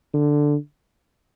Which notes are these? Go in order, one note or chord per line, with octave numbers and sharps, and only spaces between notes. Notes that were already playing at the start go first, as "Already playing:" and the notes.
D3